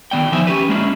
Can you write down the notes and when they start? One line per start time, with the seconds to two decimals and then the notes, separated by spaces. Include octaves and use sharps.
0.11 D#3 B3 D5 G5
0.32 E3 F3 D#4 C5 E5 G#5
0.47 C#4 G4 B4
0.69 G#3 A#3 C#4 D4 E4 F4